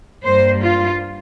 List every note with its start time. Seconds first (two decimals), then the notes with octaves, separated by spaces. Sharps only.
0.23 G2 G3 A#3 C5
0.61 F4